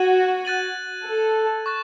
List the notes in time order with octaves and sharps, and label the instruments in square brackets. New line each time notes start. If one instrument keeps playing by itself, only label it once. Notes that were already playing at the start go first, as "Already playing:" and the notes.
Already playing: [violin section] F#4 [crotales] G#6 D#7 F#7
[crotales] F#6 A6 D#7 F#7
[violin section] A4
[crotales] C#6 F#6 A6